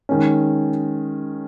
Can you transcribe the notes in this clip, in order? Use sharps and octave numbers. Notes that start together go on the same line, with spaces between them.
D#3 G#3 C#4